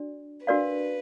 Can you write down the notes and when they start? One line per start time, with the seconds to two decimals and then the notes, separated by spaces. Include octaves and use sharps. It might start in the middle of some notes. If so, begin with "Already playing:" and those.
Already playing: D4 F#4 D5
0.47 D4 F#4 A#4 B4 D5 F5